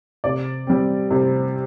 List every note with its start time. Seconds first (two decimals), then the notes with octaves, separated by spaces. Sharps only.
0.24 C3 D5
0.67 G3 C4
1.11 C3